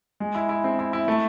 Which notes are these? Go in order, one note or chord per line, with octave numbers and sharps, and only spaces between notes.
G#3
E4
E4
C4
E4
E4
A3